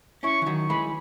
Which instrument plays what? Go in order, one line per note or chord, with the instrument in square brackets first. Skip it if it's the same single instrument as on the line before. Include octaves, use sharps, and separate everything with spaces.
[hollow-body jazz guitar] C#4 E4 [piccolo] C#6
[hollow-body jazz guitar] E3
D#3 F#3
[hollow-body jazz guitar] E3 G#3 [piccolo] B5